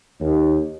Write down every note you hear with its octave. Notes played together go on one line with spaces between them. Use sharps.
D#2